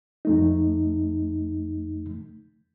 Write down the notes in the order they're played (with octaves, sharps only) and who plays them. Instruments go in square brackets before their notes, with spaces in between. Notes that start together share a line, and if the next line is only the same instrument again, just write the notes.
[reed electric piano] F2 A3 D#4